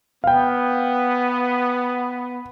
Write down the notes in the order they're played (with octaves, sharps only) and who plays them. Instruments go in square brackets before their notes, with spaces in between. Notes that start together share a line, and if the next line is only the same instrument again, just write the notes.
[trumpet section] B3 [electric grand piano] F5 G5